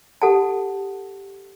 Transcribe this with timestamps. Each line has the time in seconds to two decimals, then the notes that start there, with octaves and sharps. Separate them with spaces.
0.22 G4 A4 F#5 A5